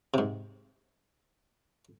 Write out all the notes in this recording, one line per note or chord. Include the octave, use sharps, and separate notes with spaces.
G#2 C3